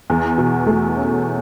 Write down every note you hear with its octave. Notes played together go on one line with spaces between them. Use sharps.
E2
B2
A3
C#4